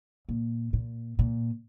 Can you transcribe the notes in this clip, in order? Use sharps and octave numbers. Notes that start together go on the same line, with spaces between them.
A#2
A#2
A#2